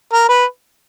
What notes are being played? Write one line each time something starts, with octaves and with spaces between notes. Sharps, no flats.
A#4
B4